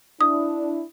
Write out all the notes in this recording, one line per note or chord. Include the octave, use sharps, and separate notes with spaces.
D4 E4 D#6